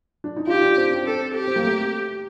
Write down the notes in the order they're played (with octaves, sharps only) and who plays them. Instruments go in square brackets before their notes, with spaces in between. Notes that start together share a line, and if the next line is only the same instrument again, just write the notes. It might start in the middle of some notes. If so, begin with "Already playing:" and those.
[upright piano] D4
D#4
[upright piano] F4 [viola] G4
[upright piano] D4
C4
C4
[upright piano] C4 [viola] A4
[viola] G4
[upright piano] C4
A#3
A3